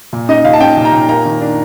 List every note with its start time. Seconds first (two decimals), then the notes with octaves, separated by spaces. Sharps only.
0.13 A#2
0.29 D#4 D#5
0.45 A#2 F5
0.53 A5
0.60 D#4 G5
0.77 A#2
0.85 A#5
0.93 A#2
1.09 A#3 A#5
1.25 D#3
1.41 D4